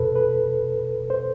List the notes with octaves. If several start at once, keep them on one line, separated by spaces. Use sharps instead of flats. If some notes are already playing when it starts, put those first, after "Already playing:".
Already playing: E2 B2 A4 B4
B4
C5